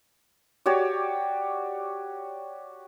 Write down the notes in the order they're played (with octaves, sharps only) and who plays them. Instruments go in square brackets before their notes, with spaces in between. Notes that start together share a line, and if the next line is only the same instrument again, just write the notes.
[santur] F#4 G4 C#5 D5